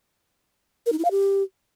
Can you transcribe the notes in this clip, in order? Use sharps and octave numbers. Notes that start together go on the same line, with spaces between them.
A#4
D#4
E4
F5
G4